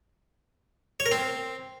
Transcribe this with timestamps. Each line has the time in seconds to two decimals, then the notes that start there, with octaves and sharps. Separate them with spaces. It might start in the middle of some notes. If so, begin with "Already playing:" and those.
1.00 C#5
1.06 A#4
1.11 C4